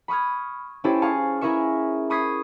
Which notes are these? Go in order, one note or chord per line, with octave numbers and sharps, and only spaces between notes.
B5 C#6 D#6 F6 G#6
C#4 E4 G4 A4 C5 C#5
G#4 F5 A5 C#6
E4 G#4 A#4 E5 C#6
B5 C#6 D#6 G#6 B6 C7